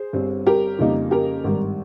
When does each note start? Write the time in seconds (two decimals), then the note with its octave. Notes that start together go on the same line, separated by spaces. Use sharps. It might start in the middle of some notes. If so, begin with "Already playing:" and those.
Already playing: G#4 C5
0.13 G1 G2 G3 C4
0.47 G4 A#4
0.79 F2 C#3 G3 A#3 D#4
1.11 G4 A#4
1.44 G#1 G2 D#3 G3